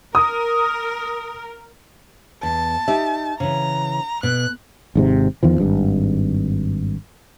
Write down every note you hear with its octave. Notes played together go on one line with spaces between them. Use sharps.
A#4 D#6
E2 A5
D#4 G4 E5
C#3 E3 A#5
B2 F#6
G#1 G#2 C3
E2 D#3 F3
G#1 G2